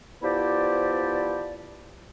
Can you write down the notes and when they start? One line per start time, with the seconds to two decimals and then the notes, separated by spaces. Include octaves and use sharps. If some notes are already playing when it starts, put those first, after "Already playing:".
0.23 F3 B3 E4 G4 C5 D5